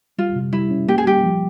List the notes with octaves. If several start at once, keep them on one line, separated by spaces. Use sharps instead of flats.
G3 F4
C3
G3 E4
C#4
A#3 G4
G#4
G3 G4
F3